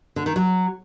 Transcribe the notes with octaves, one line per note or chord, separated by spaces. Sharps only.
D3
D#3
F#3